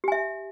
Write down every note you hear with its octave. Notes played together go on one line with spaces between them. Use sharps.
G4 E5 G#5